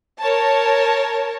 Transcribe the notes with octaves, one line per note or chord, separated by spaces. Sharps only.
A#4 C#5 A5